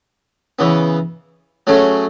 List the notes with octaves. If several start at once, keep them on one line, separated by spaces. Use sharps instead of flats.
C#3 E3 B3
F#3 A3 C#4 G#4